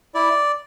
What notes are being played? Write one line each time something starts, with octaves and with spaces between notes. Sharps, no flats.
E4 D5